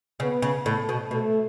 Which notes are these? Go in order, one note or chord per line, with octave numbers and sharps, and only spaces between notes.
C#3 B3
C#3
A2
B2
B2 A3